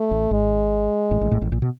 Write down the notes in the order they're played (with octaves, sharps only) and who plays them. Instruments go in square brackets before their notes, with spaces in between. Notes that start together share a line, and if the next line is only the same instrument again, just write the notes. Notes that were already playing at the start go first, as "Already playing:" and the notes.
Already playing: [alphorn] A3
[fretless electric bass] A1 A2
[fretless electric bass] G#1 G#2 [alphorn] G#3
[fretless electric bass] A1 A2
A1 A2
A1 A2
A1 A2
A#1 A#2
B2